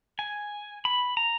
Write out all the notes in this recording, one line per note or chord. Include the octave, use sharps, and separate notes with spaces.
G#5
B5
A#5